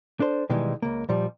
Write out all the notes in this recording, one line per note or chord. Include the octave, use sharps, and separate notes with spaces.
D4 A4 C5
B2 D#3 E3 G3 G#3
C#2 A#3
A#2 F3 G3